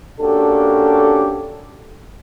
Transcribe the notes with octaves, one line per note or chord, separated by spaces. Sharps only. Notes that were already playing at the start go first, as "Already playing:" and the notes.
A#3 C#4 D4 F#4 G4 A4